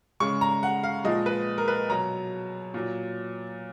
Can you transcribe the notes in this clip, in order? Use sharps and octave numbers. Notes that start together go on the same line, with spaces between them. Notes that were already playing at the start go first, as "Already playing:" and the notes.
C#3 G#3 C#6
A#5
F#5
F5
A#2 F3 G#3 D#5
B4
A#4
B4
B2 F#3 A#5
A#2 F#3